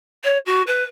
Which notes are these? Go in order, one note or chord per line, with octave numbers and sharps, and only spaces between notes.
C#5
F#4
B4